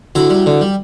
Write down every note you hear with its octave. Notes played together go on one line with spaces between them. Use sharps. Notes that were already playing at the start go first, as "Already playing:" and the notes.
D3 E4 F#4
G3
D3
G3